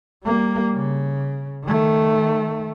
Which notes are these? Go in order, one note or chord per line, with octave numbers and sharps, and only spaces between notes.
G3 A#3
C#3
D#3 A3